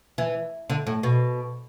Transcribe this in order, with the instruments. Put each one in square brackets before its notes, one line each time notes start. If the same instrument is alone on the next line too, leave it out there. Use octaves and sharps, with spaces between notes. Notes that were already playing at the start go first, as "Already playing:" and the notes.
[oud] E3
D3
A2
B2